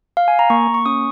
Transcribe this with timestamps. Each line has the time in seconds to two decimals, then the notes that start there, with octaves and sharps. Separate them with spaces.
0.17 F5
0.28 G#5
0.39 A#5
0.50 A#3 C#6
0.67 A#3
0.74 C#6
0.86 C#4 D#6